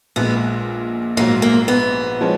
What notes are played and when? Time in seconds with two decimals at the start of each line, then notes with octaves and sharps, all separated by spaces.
0.16 A#1 A#2 G#3 B3
1.17 A#1 G#2 F#3 A#3
1.42 A#3
1.68 B3
2.21 F3 G#3 C#4